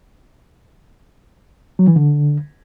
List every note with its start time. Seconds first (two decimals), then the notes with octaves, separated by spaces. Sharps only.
1.79 F#3
1.87 E3
1.96 D3